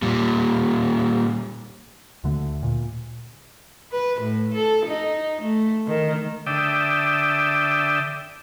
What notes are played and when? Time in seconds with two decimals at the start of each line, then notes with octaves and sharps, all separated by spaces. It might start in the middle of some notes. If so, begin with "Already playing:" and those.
0.02 A#2 G3
2.24 D2 D3 A3
2.63 A#2
3.92 B4
4.21 A2
4.54 A4
4.85 D#4
5.41 A3
5.87 D#3
6.46 D3 D5 E5 G5 D#6